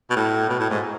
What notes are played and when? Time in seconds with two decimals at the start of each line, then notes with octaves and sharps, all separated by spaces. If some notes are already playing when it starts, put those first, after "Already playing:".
0.10 B2
0.16 A2
0.49 B2
0.59 A2
0.70 G#2